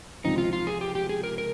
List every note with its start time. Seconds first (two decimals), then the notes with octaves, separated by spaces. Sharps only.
0.24 C#2 C3 F3 C4 D#4
0.38 F4
0.53 F4
0.67 G#4
0.81 G4
0.95 G4
1.09 G#4
1.24 A#4
1.38 A#4